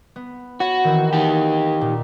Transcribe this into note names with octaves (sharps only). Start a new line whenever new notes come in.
B3
F#4 C#5 F#5 B5
D#3 E3 C4
D#4 G4
A#2